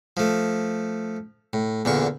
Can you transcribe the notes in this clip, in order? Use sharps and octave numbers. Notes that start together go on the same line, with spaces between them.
F3 A3
A2
E2 A#2 D3 C#6